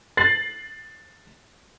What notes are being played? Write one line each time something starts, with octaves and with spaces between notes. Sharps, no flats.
A6 C7 F#7